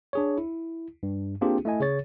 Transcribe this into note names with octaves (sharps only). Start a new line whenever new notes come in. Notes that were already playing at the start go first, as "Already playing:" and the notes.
D4 G#4 C#5
E4
G2
A#3 C4 D4 F4 G4 G#4
A3 E4 D#5 G#5
C#3 G#4 C#5 A6